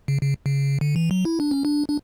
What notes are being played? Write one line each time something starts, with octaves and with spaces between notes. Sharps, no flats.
C#3
C#3
C#3
D3
E3
F#3
E4
D4
C#4
D4
D4